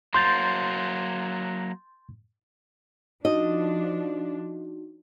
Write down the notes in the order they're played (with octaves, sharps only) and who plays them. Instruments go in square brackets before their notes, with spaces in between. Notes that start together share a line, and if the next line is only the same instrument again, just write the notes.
[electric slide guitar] F#3 A#3 [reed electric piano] C6 G6 A6
[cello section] F3 D4 [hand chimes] D#4 F#4 [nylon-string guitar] D#5